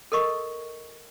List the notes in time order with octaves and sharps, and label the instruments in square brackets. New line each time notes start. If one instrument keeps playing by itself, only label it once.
[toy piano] A4 A#4 D#5 C#6